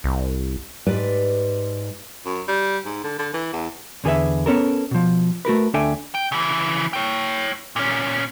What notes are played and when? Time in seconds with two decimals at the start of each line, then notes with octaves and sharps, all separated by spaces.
0.04 C2
0.86 G#2 G4 B4 D5
2.26 F#2
2.48 G3
2.85 G#2
3.04 D3
3.19 D3
3.34 E3
3.53 E2
4.04 E2 D3 G#4 A4 B4 E5
4.46 B3 C#4 A4 A#4
4.91 B2 F3
5.45 A3 F#4 A#4 B4
5.74 D2 D4 A4 E5 G5 G#5
6.15 G5
6.32 C#3 E3
6.93 C#5 G5
7.76 A#2 C#4